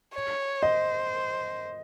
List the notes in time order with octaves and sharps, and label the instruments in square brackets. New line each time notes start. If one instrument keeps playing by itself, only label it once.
[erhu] C#5
[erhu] C5 [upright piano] D#5